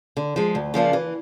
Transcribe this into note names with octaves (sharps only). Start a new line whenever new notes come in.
D3
F3 G#3
D2
C#3 F3 A#3 D4
E3